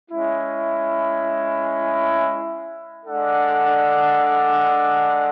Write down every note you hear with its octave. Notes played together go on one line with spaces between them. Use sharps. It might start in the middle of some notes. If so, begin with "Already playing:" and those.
G#3 C#4 E4
G#3 D4 A4 D5 F#5